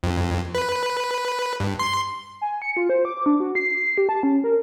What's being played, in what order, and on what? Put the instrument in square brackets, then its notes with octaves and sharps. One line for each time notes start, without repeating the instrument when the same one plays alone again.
[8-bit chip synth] F2
B4
G2
C6
[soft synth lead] G#5
C#7
F4
C5
D6
D4
F#4
C7
G4
A5
C#4
A#4